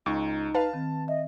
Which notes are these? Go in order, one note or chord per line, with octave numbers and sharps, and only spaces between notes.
C#2 D#4 C#6
B4 F5 A5
D#3 C4
D#5 E5